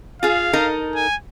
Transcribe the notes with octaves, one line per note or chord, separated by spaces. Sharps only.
F4 G#4 F5
D#4 A4 A#4
G#5